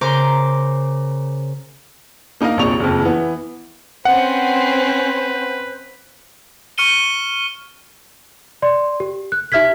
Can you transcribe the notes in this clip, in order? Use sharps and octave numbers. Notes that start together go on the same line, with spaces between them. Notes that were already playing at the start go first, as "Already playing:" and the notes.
C#3 A#4 C5 C6 D6
A#3 D#4 A#4 D#5 F5
E1 A#1 C3 C#6 F7
F#1 F2
E3 B3
C4 C#4 B4 C5 F#5
C#6 F6 C#7 D#7 G7
D5 C6
G4
F#6
D#4 G4 E5 F6 G#6 B6